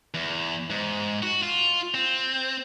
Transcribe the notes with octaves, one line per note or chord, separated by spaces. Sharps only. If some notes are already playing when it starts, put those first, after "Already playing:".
E2
G#2
F#4
F4
C4